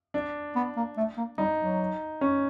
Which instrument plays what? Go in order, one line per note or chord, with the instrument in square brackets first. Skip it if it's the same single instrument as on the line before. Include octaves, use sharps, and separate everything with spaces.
[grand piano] D4
[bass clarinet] B3
A#3
A3
A#3
[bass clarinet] G3 [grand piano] D#4
[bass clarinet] F#3
[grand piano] C#4